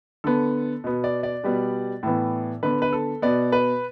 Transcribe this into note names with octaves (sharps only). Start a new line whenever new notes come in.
D3 B3 A4
B2 B3
D5
D5
B2 G3 B3
A2 E3 B3
D3 B3 B4
B4
A4
B2 B3 D5
B4